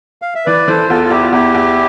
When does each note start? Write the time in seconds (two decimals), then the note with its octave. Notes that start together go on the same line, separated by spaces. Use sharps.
0.22 F5
0.35 E5
0.46 E3 B4 D5
0.68 E3 A4 C5
0.89 E2 F4 A4
1.04 F4
1.10 E2 E4 G4
1.22 F4
1.32 E2 E4 G4
1.54 E2